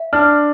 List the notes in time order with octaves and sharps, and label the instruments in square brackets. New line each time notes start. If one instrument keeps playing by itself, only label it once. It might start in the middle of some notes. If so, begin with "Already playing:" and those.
Already playing: [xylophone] E5
[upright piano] D4 [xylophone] F6